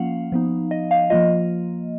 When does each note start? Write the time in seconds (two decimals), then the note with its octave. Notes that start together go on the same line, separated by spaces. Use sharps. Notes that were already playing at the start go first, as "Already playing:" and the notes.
Already playing: F3 A#3 C#4 F4 F5 F#5
0.32 F3 B3 D#4
0.71 D#5
0.91 F5
1.10 F3 A#3 F4 D#5